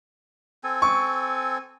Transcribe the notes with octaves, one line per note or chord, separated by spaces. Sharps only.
C4 A4 G#5
C#6